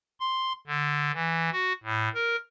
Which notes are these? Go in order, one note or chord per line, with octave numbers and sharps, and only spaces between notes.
C6
D3
E3
F#4
A2
A#4